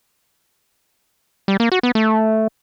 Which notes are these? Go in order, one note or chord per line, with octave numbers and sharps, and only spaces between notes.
G3
A#3
F#4
B3
A3